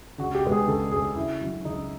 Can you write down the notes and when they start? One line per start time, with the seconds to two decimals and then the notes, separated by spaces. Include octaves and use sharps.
0.18 C#2 F#4
0.35 G4
0.44 B2 G#3 B3
0.52 G#4
0.68 C#2 A4
0.91 B2 G#3 B3 G#4
1.16 C#2 E4
1.41 C#3 F#3
1.65 C#2 D#4